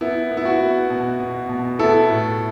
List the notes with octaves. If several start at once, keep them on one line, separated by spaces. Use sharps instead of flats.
B3 E4
B3
E4
F#4
B3
B2
B2
B2
B3 E4 A4
A2